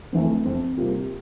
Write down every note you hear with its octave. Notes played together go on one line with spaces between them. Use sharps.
F2 E3 A3
F2
C3 G3 A#3 F4